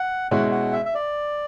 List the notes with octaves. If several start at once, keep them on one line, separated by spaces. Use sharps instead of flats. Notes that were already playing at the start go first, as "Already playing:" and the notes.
Already playing: F#5
B2 G#3 C#4 E4 F#5
F#5
E5
E5
D5